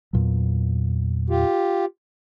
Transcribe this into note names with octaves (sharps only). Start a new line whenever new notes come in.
E2 A#2 F#3
F4 G4